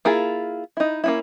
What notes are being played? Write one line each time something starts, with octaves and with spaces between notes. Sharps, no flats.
A#3 E4 F4 G#4
D#4 E4
A#3 C#4 E4